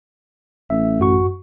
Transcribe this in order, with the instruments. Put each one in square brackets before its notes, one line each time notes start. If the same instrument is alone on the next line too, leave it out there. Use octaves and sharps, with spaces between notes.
[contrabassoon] A1 [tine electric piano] E5
[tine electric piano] F#2 F#4 C#6